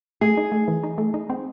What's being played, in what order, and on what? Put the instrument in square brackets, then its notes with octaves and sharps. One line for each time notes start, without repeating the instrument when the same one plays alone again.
[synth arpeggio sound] A3 [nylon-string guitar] G#4
[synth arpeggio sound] D#4
A3
E3
D#4
A3
D#4
C4